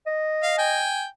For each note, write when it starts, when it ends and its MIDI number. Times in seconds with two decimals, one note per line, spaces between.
0.07 0.87 75
0.43 0.58 77
0.58 1.05 79
0.58 1.05 80